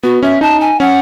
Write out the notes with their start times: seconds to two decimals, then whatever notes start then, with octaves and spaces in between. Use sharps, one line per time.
0.03 B3 F#4
0.23 C#4 E5
0.41 D#4 A5
0.61 G#5
0.80 C#4 F#5